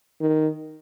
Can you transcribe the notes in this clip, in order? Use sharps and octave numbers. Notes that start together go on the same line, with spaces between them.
D#3